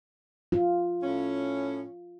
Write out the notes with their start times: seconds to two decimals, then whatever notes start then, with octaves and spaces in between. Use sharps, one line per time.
0.52 F4
1.01 A2 C#4